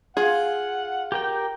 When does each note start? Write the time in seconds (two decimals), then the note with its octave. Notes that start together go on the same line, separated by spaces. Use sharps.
0.17 F4 G#4 F#5
1.12 G4 A#4 G5